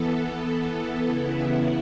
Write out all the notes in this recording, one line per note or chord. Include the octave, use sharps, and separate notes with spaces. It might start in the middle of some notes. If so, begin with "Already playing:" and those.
Already playing: E3 B3 A4
C#3 E3 B3 E4